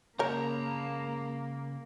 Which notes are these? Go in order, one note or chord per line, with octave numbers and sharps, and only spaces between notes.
C#3 A#3 A#4 C#5 A5 A#5 G6